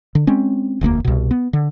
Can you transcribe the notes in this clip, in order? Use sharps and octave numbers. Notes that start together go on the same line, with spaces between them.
D3
G#3 C4 C#4
E1 D2 A3 A#3
C2 B2
B3
D3